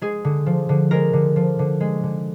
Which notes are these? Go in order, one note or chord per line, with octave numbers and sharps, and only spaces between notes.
G#3 G#4
D3
F3
D3
G#3 A#4
D3
F3
D3
G#3
D3